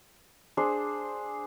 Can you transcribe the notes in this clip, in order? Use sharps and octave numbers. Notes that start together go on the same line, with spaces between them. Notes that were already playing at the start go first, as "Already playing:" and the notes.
D4 G#4 C5